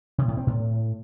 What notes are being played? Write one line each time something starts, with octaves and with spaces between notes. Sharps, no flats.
C3
A2
C4
A2